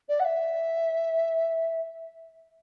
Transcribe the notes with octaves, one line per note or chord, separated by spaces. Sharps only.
D5
F#5
E5